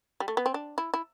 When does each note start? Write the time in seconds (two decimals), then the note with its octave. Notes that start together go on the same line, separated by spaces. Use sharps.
0.20 G3
0.28 A3
0.37 B3
0.46 C4
0.54 D4
0.78 E4
0.94 E4